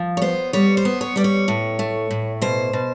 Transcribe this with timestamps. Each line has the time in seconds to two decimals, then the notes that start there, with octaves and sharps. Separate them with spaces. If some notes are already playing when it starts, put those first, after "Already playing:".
Already playing: F3
0.17 C#5
0.22 B3 C5
0.53 G3 C#5
0.77 C5
0.85 B3
1.01 C#5
1.16 G3 D5
1.24 C#5
1.48 A2
1.79 A3
2.11 A2
2.41 B2 C5
2.73 B2